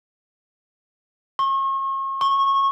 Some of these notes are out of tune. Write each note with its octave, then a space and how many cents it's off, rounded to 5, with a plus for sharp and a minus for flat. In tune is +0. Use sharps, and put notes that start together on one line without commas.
C#6 -40
C#6 -20